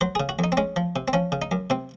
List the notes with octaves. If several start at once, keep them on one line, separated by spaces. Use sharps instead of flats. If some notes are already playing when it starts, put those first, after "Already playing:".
F#3 C5
C#3 G#4
F#4
F2 D#4
C4
G#3 C#4
F3
C3
C4
F3 C#4
C#3
D#4
F#2
C3 C4